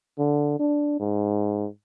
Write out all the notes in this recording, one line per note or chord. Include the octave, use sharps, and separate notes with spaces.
D3
D4
G#2